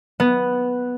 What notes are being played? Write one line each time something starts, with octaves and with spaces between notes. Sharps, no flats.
B3